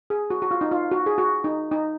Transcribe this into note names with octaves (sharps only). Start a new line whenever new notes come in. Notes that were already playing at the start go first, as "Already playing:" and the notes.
G#4
F#4
F#4
F4
D#4
F4
F#4
G#4
F#4
D#4
D#4